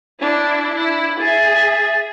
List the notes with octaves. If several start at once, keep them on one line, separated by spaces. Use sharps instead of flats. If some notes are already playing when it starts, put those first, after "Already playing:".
D4 E4
E4
G#4 E5 A6